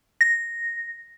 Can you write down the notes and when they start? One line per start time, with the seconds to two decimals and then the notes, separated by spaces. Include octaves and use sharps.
0.21 A#6